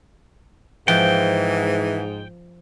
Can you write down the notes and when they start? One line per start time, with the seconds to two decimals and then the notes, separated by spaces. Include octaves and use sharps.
0.88 G#2 E3 F3 G5